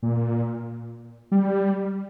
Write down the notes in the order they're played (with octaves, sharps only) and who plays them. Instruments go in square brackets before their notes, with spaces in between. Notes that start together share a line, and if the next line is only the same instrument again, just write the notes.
[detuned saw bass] A#2
G3